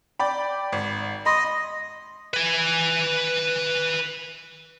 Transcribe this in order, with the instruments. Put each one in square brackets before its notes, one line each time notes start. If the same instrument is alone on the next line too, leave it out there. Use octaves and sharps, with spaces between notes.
[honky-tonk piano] D5 G5 B5
G#1
[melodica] D#5 [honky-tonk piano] B5 C6
[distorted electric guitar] B4 G#5